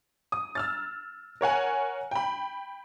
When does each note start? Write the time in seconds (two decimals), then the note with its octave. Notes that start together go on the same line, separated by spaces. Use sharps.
0.32 D#6
0.55 E6 F6 A6
1.41 A#4 C#5 F#5 G#5
2.11 G5 B5